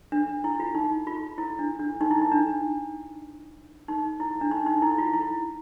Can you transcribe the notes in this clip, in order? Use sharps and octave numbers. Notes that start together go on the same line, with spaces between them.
D4
E4
F4
D#4
F4
E4
D4
D4
D#4
E4
D#4
D4
D#4
E4
D4
D#4
D#4
E4
F4
E4